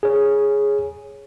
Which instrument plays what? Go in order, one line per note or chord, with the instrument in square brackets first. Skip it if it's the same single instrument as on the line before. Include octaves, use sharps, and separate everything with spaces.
[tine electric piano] G#4 C#5